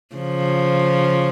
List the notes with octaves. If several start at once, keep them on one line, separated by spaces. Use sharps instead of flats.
C#3 F3